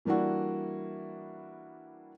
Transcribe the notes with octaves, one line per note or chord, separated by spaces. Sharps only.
E3 G3 A#3 D4 E4 F#4